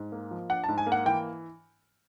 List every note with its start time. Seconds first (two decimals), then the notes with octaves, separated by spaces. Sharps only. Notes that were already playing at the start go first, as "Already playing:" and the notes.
Already playing: G#2
0.12 A#3
0.31 F3
0.50 D4 F#5
0.64 A5
0.68 G#2
0.78 G#5
0.87 A#3
0.92 F#5
1.06 E3 G5